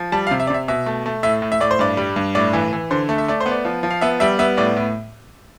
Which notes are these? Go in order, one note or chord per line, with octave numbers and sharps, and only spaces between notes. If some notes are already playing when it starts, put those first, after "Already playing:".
Already playing: F3
G3 A5
F5
C3
E5
D5
C3 E5
B2 E5
A3
A3
A2 E5
A2
E5
A2 D5
C5
G2 D5
G3
G2
A2 D5
E3
E3
D3 C5
A3
E5
A3 D5
C5
B3
D5
F3
F3
F5
B3 E5
G3 E5
B3 E5
A2 D5
A2